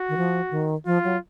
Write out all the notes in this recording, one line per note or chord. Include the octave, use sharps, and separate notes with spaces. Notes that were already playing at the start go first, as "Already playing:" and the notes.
Already playing: F#4
D#3
F3
D#3
F3 F4
F#3